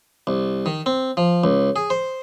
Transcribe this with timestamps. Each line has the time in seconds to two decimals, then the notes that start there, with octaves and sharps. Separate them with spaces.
0.27 C2
0.66 D#3
0.86 C4
1.17 F3
1.44 C#2
1.76 G#4
1.90 C5